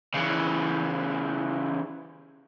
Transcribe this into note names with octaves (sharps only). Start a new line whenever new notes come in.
C#3 E3